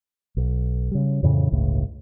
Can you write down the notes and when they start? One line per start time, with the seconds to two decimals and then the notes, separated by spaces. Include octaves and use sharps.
0.37 B1
0.91 C#3 G3
1.23 F2 A2 C#3 E3
1.52 G1 C#2 A2